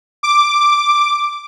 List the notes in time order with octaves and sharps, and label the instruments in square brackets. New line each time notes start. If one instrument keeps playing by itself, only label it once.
[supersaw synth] D6